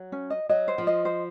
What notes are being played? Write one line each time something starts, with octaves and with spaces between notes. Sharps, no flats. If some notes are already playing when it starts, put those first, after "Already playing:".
Already playing: F#3
C#4
D#5
F#3 D#5
C5
F3
D#5
C5